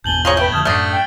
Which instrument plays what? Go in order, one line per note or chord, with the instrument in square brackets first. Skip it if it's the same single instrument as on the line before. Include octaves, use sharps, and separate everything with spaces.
[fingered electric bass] G#1 E2 B2 [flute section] G#5 A5 [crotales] G6 F#7 G7
[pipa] F4 G#4 C#5 [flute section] G#5 A#5
[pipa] A3 [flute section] B4 G5 G6
[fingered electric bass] F2 D3 [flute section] A5 D#6 F6 [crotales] G#6
[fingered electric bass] F#2 A2 [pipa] D3 A3 [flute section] D#6 [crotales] F6 A6 C7
[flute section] E5 G5